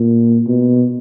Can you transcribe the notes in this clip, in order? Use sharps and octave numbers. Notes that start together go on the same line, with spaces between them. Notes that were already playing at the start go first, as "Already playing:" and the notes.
Already playing: A#2
B2